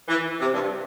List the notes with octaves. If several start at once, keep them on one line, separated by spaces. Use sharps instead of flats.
E3
C3
G2